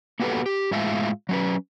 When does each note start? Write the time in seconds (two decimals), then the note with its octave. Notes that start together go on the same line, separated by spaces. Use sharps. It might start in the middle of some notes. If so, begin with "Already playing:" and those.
0.20 A#3 B3 F#4 G4 A4 B4
0.46 G4
0.71 A2 G#3 F4 E5
1.29 F#3 C#4 B4